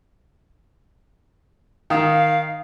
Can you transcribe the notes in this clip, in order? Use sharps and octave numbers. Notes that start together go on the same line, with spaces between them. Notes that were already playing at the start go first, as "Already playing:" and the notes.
D#3 F5